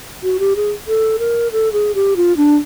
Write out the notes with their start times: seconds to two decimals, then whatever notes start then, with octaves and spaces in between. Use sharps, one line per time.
0.23 F#4
0.39 G4
0.56 G#4
0.88 A4
1.19 A#4
1.52 A4
1.73 G#4
1.95 G4
2.16 F4
2.37 D4